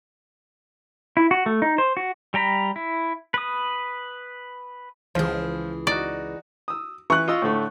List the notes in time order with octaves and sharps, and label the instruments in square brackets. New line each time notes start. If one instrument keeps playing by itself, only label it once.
[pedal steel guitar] E4
F#4
A3
D#4
C5
F#4
G3 G5 A#5 B5
E4
B4 D#6
[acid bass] C#2 [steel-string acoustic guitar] E3 G#4 [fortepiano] F3
[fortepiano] D#4 F#4 [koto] D5
[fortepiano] D#6 E6
[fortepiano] E3 [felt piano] C#6 F#6
[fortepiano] F4 D#5 E6
A2 D3 A3